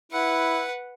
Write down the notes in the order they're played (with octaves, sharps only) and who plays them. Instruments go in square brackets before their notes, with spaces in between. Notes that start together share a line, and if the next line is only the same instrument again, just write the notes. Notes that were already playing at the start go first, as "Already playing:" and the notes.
[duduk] E4 [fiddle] B4 F#5